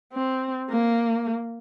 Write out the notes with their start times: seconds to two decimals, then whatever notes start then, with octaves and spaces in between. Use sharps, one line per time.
0.13 C4
0.70 A#3